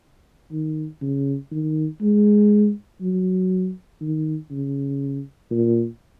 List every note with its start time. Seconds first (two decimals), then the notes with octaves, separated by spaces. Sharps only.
0.52 D#3
1.01 C#3
1.51 D#3
2.01 G#3
3.01 F#3
4.01 D#3
4.51 C#3
5.51 A#2